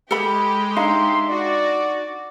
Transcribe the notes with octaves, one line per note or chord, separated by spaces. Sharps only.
G#3 G4 A4 B5
D4 D#4 E5 F5 C6
F#4 D5